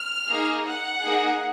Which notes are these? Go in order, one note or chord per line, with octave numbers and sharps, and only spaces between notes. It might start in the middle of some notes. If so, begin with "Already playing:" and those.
Already playing: F6
A#3 D#4 G#4
F#5
A#3 D#4 G#4